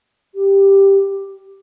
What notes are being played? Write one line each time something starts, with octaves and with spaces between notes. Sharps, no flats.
G4